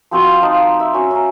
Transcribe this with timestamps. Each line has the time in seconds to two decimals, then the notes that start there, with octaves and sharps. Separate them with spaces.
0.11 F3 C4 F#4 C5
0.26 G5
0.42 F3 D#4 F4
0.80 E5
0.94 C#4 F#4
1.11 C#4 A#5